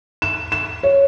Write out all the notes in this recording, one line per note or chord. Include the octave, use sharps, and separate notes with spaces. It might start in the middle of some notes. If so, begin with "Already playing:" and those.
E7
E7
C#5